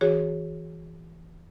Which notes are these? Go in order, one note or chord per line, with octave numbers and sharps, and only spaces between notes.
E3 F#4 G#4 C#5